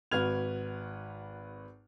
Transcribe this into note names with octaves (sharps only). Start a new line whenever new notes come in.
G#1 F#4 B4 F6 G#6 F7